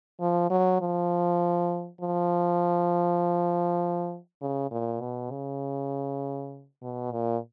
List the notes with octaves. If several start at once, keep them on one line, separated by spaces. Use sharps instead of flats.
F3
F#3
F3
F3
C#3
A#2
B2
C#3
B2
A#2